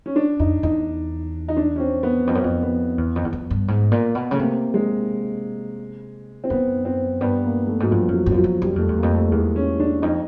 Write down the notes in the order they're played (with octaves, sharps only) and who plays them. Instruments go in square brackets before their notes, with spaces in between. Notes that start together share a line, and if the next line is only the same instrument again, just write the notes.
[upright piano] C#4
D4
[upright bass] F2 [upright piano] D#4
[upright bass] E2 [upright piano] D#4
[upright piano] D#4
D4
C#4
C4
B3
[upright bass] F2 [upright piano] C4
[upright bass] F#2
F2
[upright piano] B3
[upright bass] E2
F2
E2
F2
G2
G#2
A#2
B2
[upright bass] C#3 [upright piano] A3
[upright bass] C3 [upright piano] A#3
[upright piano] G#3
C4
[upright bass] F#2 [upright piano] B3
[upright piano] C4
[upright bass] G2 [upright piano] B3
[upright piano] A#3
A3
[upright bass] G#2 [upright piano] F#3
[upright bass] G2 [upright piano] F3
[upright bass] F#2
[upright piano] F#3
[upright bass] F#2
[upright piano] F3
F#3
[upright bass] F#2
[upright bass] F#2 [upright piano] G3
[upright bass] F2 [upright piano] A3
[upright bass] E2
[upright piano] A#3
[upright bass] F2
[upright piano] A3
[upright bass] E2 [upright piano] G#3
[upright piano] C#4
D4
[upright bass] F2 [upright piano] D#4